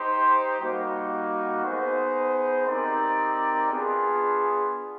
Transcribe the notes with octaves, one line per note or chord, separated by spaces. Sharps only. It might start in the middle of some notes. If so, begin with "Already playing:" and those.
Already playing: D#4 G4 C5
G3 A#3 D#4 F#4
B3 D#4 G#4 C5
C4 D#4 G4 A#4 D5
B3 D4 F4 G#4